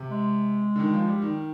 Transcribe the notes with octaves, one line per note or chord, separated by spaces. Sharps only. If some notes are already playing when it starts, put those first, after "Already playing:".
Already playing: C3
G#3
D3
D#3
F3
G3
D#3